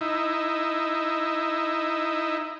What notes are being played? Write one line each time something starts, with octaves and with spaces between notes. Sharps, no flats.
D#4 E4